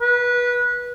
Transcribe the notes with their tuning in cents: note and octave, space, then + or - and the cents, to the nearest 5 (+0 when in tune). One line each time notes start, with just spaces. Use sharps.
B4 -20